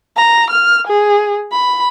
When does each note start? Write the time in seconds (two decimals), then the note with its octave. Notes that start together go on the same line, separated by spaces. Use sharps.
0.17 A#5
0.50 F6
0.87 G#4
1.52 B5